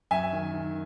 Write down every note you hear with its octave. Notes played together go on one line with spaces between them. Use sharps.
F#2 E5 G#5
D#3
D#3